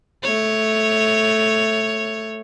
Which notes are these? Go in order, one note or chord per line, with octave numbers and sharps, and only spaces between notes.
A3 C#5